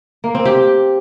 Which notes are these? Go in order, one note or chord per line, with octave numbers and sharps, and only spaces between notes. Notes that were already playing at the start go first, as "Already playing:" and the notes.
A#3
C4
G4